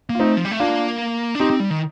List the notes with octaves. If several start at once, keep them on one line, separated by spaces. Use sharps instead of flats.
A#3
F4
A3 C4 D#4
F3
G3
A3
A#3 D4 F4
D4
C4 D#4 G4
C4
G3
D#3